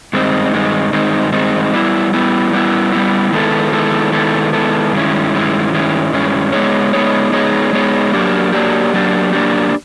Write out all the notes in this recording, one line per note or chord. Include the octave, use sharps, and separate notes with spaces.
G2 D#3 G#3 C4 D#4
G2 D#3 G#3 C4 D#4
G2 D#3 G#3 C4 D#4
G2 D#3 G#3 C4 D#4
G3 B3 E4
G3 B3 E4
G3 B3 E4
G3 B3 E4
D#3 G#3 B3 E4 A4
D#3 G#3 B3 E4 A4
D#3 G#3 B3 E4 A4
D#3 G#3 B3 E4 A4
G2 D#3 G#3 C#4 E4
G2 D#3 G#3 C#4 E4
G2 D#3 G#3 C#4 E4
G2 D#3 G#3 C#4 E4
G#3 B3 D#4 G#4 C#5
G#3 B3 D#4 G#4 C#5
G#3 B3 D#4 G#4 C#5
G#3 B3 D#4 G#4 C#5
F#3 A#3 D4 G4
F#3 A#3 D4 G4
F#3 A#3 D4 G4
F#3 A#3 D4 G4